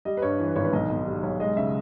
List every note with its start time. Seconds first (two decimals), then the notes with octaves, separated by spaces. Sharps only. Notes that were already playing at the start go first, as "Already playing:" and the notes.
0.05 G3 D#5
0.17 B4
0.22 G2 C#5
0.39 E3 C#5
0.48 B4
0.56 G#1 C#5
0.65 B4
0.73 B1 D#5
0.89 B2 D#5
1.06 G3
1.23 B1 C#5
1.40 G#3 D#5
1.57 C#3 E5